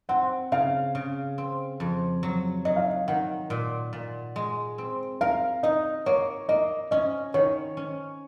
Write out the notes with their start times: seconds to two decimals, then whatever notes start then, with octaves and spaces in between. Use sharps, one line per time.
0.09 C4 F#5
0.52 C#3 F5
0.95 C#3
1.38 C4
1.80 F2
2.23 F#3
2.65 F#3 D#5
2.76 F5
2.88 D#5
3.08 D#3 F#5
3.50 A#2
3.93 A#2
4.36 G#3
4.78 C4
5.21 A#4 F5
5.63 D#4 D#5
6.06 A#3 C#5
6.49 A#3 D#5
6.91 C#4 D#5
7.34 D#3 C#5
7.77 C#4